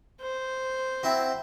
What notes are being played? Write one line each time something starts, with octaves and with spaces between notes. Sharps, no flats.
C5
C4 E4 F#4